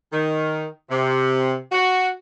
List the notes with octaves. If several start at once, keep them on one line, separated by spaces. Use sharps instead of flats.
D#3
C3
F#4